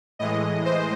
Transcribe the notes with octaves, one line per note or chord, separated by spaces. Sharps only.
A2 E3 G#3 D#5
C5